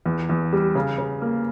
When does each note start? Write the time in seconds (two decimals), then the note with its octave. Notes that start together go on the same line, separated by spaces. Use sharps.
0.06 E2
0.29 E2
0.53 G3
0.75 C#3
0.98 C#3
1.21 A#3